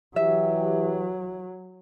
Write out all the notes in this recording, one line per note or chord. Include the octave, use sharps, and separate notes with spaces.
E3 F#3 G4 E5